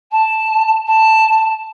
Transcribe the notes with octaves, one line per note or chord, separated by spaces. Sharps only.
A5
A5